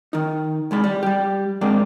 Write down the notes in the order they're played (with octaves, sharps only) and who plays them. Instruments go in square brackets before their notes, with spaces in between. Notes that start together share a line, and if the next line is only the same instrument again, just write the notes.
[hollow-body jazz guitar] D#3 D#4
C2 G#3 B5
G3
G3 G4
G#2 G#3 A#3 C4 D4